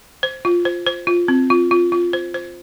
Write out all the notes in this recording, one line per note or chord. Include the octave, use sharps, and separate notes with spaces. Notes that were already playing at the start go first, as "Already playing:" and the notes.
C5
F4
C5
C5
F4
C4
F4
F4
F4
C5
C5